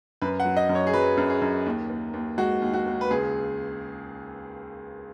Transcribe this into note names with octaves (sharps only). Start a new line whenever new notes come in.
F#2 B4
F#5
F#3
D#5
F#2
C#5
G#4
F#3 B4
F#2
G#4
F#2
D#2
D#2
D#2
G#3 F#4
D#2
F#4
D#2
B4
C#2 G#4